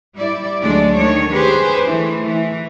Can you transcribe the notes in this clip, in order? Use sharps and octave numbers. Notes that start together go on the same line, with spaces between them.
G3 E4 D5
D2 F#3 G#3 D4 D5
D#3 A3 C#5
G4 G#4 B4 C5
E3 A3
E3